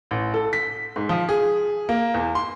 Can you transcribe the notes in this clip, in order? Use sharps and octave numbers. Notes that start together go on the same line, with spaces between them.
A1
A4
B6
G#2
F3
G#4
A#3
E2
C6